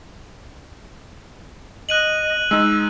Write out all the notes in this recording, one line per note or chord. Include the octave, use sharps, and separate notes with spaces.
D#5 F#6 D#7 F#7
G#3 D#4 E6